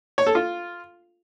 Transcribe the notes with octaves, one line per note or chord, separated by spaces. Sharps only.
C#5
A4
F4